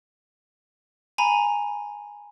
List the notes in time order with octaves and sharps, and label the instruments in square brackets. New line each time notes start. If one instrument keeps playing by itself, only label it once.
[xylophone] G#5 A#5 B5